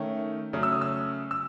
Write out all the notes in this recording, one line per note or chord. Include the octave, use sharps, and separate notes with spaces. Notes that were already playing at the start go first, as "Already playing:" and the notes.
Already playing: D#3 A3 C#4
C#3 F#3 A3 C#4
E6
D#6
E6
E6